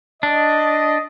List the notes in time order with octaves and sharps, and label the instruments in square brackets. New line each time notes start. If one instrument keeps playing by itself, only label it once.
[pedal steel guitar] D4 [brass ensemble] D#5